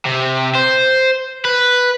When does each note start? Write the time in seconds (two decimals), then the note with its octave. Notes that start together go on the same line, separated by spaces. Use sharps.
0.05 C3
0.55 C5
1.45 B4